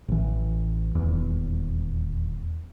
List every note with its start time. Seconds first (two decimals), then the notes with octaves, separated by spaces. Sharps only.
0.08 A1 E3
0.95 D#1 E2